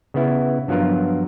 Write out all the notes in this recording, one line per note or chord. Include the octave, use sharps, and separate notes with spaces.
C#3 B3 E4
G2 F3 F#3 B3 F4 A#4